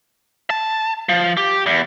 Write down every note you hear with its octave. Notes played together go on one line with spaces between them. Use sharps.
A5
F3
G4
E2